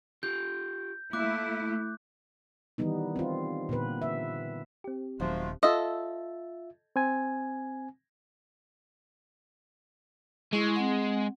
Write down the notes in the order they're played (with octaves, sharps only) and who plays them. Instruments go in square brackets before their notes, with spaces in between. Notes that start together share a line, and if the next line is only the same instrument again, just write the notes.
[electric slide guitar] F4 G4 [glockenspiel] G6
[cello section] A3 E4 [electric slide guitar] A#3 [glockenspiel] D6 F#6
[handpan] D#3 E3 G3 B3 D#4
C4 F4
A#2 D3 B3 B4
E5
[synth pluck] C4 G4
[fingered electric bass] D#1 D#3 [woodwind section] F3 G#3 A3 [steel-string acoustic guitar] F#3
[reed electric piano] F4 E5 [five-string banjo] A4 D#5
[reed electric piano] C4 G#5
[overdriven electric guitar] G#3 [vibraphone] E4 C#6
[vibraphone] C4 F#5